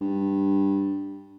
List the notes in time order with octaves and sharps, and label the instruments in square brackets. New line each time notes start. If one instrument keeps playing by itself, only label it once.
[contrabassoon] G2